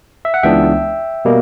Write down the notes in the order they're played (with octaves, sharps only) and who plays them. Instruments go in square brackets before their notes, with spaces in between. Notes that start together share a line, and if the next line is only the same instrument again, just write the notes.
[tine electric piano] E5
F#5
C#2 C#3 E3 B3 D4 E5 G5
B2 G3 A#3